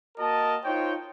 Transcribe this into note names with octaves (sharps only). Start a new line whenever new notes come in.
A#3 F#4 A#4 D#5 A5
D#4 F4 C5 C#5 G5